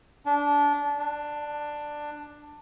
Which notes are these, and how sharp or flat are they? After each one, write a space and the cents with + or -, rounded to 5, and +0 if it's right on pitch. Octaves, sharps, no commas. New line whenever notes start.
D4 -20
D4 +10